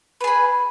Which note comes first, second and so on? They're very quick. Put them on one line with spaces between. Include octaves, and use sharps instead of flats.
B4 G#4 B5